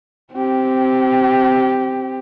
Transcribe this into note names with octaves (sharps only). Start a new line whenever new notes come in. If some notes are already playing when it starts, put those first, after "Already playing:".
C4 G4